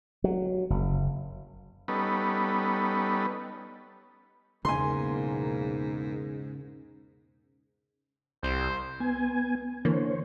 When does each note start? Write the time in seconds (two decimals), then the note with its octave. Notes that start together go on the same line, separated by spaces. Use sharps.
0.24 F#3
0.70 F#1
1.88 G3 B3 C#4 D#4 A4 B4
4.65 B1 E2 G#2 C#3 A#3 G#5 C6
8.43 C2 C5
9.00 B3 G#5
9.85 D3 E3 A#3 C5 C#5